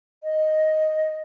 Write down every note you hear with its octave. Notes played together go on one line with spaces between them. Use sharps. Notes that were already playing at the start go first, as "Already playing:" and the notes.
D#5